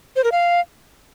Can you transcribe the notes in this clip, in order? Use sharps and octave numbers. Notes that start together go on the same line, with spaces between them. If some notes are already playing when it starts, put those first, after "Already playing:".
C5
A#4
F5